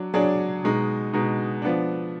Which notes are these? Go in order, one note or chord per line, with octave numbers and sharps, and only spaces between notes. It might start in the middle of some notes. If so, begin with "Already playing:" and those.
Already playing: F#3 D4
F#3 D4 G#4 D5
B2 G#3 D#4
B2 G#3 D#4
F3 B3 D4